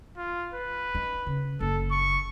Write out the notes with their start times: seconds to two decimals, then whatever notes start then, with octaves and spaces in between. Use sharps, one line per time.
0.17 F4
0.54 B4
0.95 D#4
1.26 C#3
1.60 F#1 A4
1.91 C#6